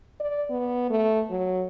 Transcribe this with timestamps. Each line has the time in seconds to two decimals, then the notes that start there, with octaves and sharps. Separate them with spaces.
0.20 D5
0.50 B3
0.90 A3
1.30 F#3